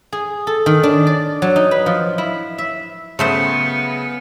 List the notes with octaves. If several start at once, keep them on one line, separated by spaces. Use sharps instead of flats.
G#4
A4
D#3
D4
D5
F#3
D#4
B4
F3
E4
E5
C#3 F#3 A3 B3 B4 C5 D#6 C#7